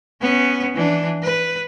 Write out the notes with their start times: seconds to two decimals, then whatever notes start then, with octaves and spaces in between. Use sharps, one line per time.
0.21 B3 C#4
0.75 E3 D4
1.23 B4